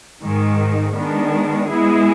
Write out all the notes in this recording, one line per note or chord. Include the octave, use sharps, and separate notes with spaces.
G#2 D#3 G#3
D#3 G#3 B3 D4
G#3 B3 E4 G#4